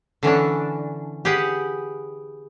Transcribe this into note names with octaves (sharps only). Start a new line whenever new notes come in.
D3 E3 C#4 D4
G4 G#4 B4 F#5